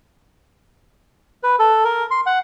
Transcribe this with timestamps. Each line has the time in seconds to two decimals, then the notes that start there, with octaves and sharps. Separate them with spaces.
1.43 B4
1.59 A4
1.85 A#4
2.11 C6
2.26 F#5